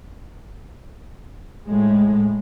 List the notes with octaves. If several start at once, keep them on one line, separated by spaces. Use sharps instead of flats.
A2 G#3